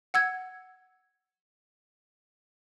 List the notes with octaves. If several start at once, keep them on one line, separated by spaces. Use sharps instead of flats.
F#5 E6 G#6